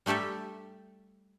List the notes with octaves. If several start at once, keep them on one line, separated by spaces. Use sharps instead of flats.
G3 A3 G4 A4 E5